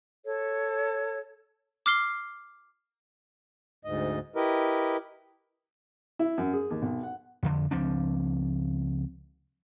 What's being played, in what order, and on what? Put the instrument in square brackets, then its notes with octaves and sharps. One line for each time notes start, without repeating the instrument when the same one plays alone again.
[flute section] A4 C#5
[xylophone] D6 F6 C7 G7
[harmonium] D2 G#2 D#5
E4 G4 A#4 B4 D#5
[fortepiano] E4
F#2
G#4
D#2
B1
F#5
[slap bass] F2 D3
C#2 F3 C4 D4